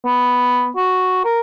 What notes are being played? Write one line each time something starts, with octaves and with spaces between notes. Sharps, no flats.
B3
F#4
A#4